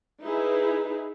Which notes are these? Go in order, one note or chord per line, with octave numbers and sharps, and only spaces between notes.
D#4 E4 G#4 B4